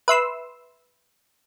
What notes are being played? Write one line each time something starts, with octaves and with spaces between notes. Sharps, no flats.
B4 E5 C6 E6